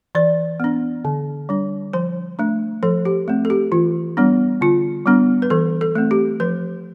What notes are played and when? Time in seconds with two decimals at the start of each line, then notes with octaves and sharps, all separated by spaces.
0.15 E3 D5
0.60 B3 D4
1.05 D3
1.49 G3 D4
1.93 F3 C5
2.39 A3 D4
2.83 F3 A4
3.05 G4
3.28 A3 C4
3.45 A4
3.50 G4
3.72 E3 F4
4.17 G3 B3 D4
4.61 D3 F4
5.06 G3 B3 D4
5.42 B4
5.50 E3 A4
5.81 A4
5.95 A3 C4
6.11 G4
6.40 F3 B4